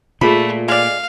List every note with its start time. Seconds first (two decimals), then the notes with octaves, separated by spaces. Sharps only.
0.21 A#2 A3 F4 G#4 B5
0.68 G#3 D5 F5